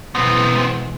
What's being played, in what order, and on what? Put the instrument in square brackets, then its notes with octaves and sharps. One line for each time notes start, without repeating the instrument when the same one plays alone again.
[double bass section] B2 E3 G#3 [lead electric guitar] B3 C4